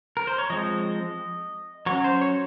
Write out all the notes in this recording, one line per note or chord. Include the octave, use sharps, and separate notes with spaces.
A#4
C5
C#5
F3 G#3 C4 D#5
F#3 C#4 C#5
C5
C#5